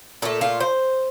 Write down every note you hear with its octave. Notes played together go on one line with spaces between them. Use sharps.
A#2 A3 A4
F4
C5